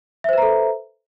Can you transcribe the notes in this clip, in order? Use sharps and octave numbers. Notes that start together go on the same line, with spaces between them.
A4 B4 C5 E5 A#5